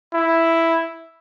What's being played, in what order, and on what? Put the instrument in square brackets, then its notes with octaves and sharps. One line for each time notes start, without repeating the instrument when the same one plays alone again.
[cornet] E4